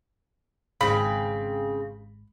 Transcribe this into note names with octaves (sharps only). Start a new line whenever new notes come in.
G#1 G#2 C#3 C4 B5